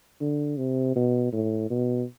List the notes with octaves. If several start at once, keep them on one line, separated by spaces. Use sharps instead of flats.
D3
C3
B2
A2
B2